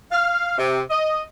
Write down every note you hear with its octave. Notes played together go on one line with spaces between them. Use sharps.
F5
C3
D#5